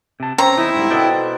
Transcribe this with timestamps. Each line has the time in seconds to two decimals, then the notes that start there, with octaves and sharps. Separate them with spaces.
0.20 C3 A5
0.38 C4 C#4 C5 C#5 A#5
0.57 E2 D#4 E4
0.75 G#2 D3 G3
0.90 B2 A4 D5 G5